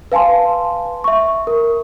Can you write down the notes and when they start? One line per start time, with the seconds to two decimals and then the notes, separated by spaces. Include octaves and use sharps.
0.12 B4 F5 G#5 A5 C6
1.04 E5 C#6
1.47 A#4